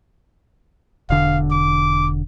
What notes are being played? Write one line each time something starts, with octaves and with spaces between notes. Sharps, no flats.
E1 D3 F5
D6